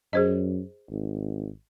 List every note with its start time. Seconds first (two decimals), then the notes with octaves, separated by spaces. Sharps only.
0.13 F#2 G#4 C5 D#5
0.90 G#1